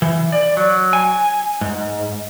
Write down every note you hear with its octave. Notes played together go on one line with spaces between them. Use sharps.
E3
D5
F#3
G#5
G#2